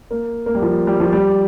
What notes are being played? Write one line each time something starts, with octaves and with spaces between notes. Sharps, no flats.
A#3
A#3
G3
F3
G3
F3
G3